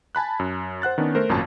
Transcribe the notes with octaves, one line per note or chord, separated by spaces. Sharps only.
G#5 A5 B5 F#6
F#2
C5 F#5 F#6 A6
D#3 B3 C#4 D4
A3 A#4 C5
G#1 F#2 A#2 A5